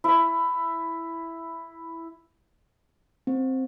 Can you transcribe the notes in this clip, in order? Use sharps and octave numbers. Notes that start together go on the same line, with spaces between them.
E4 E5
C4